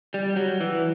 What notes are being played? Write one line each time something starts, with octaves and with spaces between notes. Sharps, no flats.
G3
F#3
E3